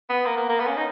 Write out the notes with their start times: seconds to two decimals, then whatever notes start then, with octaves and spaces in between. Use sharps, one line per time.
0.10 B3
0.26 A#3
0.37 A#3
0.49 A#3
0.60 B3
0.67 C#4
0.76 D#4